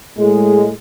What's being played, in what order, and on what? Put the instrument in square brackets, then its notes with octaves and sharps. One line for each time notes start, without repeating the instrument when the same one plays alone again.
[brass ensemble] A2 G#3